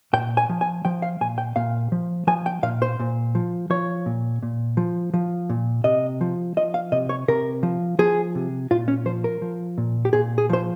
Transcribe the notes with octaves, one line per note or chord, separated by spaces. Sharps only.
A#2 G5
G#5
F3
G#5
F3 G5
F5
A#2 G#5
G5
A#2 F5
F3
F3 G#5
G5
A#2 F5
C5
A#2
F3
F3 C#5
A#2
A#2
F3
F3
A#2
C3 D#5
F3
F3 D#5
F5
C3 D#5
C#5
C3 A#4
F3
F3 G#4
C3
A#2 F4
C#4
F3 C5
A#4
F3
A#2
G4
A#2 G#4
G#4
F3 C5